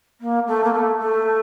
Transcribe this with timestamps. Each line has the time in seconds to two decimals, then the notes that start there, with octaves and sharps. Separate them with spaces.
0.21 A#3
0.47 A3
0.64 A#3
0.73 A3
0.99 A3